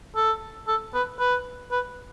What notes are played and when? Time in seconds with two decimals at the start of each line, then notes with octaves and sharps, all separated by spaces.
0.16 A4
0.68 A4
0.94 B4
1.19 B4
1.72 B4